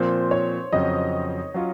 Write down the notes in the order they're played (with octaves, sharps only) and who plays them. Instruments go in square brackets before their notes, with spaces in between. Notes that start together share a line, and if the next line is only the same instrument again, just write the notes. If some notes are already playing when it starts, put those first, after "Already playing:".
Already playing: [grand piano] A#2 F3 C4 [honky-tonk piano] C5
[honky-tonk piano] C#5
[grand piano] F2 C#3 F#3 C4 [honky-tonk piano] D#5
[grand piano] F#3 C#4 F4